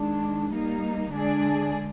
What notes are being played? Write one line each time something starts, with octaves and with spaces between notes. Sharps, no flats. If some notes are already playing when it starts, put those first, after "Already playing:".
Already playing: D#3 G#3 D4
G3 A#3 D#4
D3 G#3 D4 G#4 D5